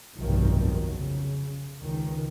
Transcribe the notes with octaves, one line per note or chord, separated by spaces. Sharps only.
F1 B1 G2 D#3 F3 F#3
D#3 F#3
C#3
C#2 D#3